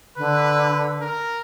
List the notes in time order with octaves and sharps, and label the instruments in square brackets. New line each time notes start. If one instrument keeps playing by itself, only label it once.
[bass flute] D3 [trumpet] B4
[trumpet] A#4